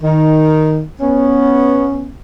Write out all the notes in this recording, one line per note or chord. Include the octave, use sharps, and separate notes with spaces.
D#3
B3 C#4